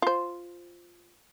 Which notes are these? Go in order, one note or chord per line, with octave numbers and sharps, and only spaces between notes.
F4 C5